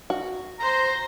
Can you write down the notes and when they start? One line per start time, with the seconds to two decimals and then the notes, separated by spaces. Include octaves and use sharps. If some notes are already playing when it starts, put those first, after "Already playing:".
0.10 F#4
0.60 C5 A#5 C6